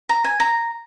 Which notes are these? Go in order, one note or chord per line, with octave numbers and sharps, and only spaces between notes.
A#5
G#5
A#5